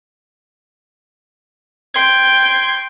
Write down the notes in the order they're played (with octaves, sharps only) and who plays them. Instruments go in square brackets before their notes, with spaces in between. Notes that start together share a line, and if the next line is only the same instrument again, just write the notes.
[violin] G5 [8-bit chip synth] C6 G#6